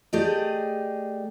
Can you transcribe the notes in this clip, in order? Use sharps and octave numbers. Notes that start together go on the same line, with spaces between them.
A3 G4 G#4 D5 D#5